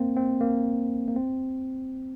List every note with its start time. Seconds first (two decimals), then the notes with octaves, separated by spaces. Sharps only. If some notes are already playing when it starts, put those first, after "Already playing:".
Already playing: A#3 C4
0.16 C4
0.41 A#3
1.08 A#3
1.16 C4